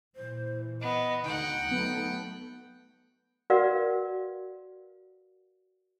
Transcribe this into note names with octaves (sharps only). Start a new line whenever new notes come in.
A#2 E3 C5
B3 D#5
D2 D3 D#4 F#5 G5
F#3 A3 B3
F#4 A#4 B4 D5 F5 F#5